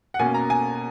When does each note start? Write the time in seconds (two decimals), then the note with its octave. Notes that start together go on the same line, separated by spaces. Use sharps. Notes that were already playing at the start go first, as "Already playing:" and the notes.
0.14 F#5
0.19 B2 A#3 C#4 G#5
0.34 A#5
0.50 G#5